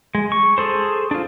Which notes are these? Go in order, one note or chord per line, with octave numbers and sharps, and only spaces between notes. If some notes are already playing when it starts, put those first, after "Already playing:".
G#3
C#6
G#4 A4 C5
D4 F4